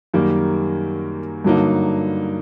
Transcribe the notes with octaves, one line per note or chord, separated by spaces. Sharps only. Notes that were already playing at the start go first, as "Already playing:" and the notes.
F#2 D#3 G3 A#3
G2 D3 F#3 A#3 D#4